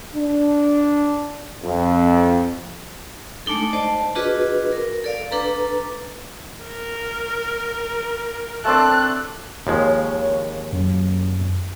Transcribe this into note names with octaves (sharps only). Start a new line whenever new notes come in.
D4
F2
G#3 A3 D4 D#4 A4
C5 D5 D#5 A5
D4 F4 F#4 G#4 B4 D#5
A#4
A4 D5 F5
D4 A4 B4 A#5
A#4
A3 C4 D4 A5 F#6
D#2 F3 G#3 C#5
F#2